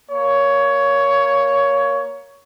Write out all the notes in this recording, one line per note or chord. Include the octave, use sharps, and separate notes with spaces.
A#3 C#5